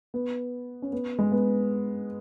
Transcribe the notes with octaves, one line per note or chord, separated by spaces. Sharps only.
B3
C#4
B3
G#3
B3